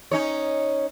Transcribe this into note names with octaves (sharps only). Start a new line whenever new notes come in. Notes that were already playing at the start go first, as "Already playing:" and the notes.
C#4 D#4 C#5